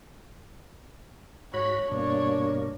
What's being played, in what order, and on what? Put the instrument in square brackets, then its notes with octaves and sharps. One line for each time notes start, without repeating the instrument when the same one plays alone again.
[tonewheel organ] G#2 F#4 B5 [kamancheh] C#5
[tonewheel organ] G2 B2 A#3 [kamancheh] D4 C#5